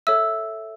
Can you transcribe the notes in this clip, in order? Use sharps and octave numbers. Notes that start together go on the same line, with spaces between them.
A4 C#5 E5 E6